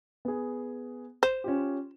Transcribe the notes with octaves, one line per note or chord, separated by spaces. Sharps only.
B3 G#4
C5 E7
C#4 F4 G4